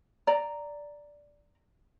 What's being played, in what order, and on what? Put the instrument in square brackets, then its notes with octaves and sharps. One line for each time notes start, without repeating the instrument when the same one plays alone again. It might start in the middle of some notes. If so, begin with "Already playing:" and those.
[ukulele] D5 A#5